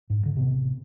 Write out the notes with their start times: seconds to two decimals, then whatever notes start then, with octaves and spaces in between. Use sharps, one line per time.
0.10 G#2
0.22 A1 D3
0.35 A1 C3 B3